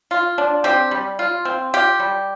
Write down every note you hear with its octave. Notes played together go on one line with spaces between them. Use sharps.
F4
D4
C4 G4
G3
F4
C4
F4 G4
G3